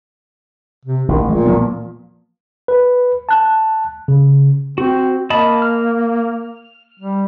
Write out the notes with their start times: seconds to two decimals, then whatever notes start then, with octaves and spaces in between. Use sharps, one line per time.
0.85 C3
1.08 A1 D#3
1.28 A#2 G#3
1.45 F3 A#3 B3
2.68 B4
3.29 A5 F#6
4.08 C#3
4.78 C4 F#4
5.30 A#3 D#5 A5 B5
5.62 F6
7.00 G3